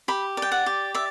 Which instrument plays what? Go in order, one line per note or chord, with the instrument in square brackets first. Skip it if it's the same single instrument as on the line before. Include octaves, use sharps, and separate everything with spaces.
[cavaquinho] G4 B5
D5 G5
F#5
G4
D5 E5